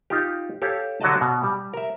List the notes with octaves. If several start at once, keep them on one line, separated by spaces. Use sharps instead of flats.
D#4 F4 G4
G4 A4 C#5 F5
D3 F#3 F#4 D5 D#5 A5
B2
G3
A#4 E5